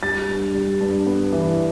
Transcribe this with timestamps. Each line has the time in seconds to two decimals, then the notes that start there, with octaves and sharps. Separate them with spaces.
0.03 G3 A6
0.28 G2
0.54 G3
0.81 G2
1.06 B3
1.32 E3